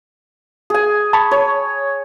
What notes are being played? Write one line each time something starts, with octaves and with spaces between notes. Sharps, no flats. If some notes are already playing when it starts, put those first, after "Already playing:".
G#4 G#5
A5 B5 C#6
C#5